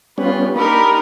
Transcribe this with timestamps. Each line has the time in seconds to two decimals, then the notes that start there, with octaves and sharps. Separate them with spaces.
0.18 G3 B3 C#4 F4 B4
0.56 A#3 D4 D#4 G4 A#4 B5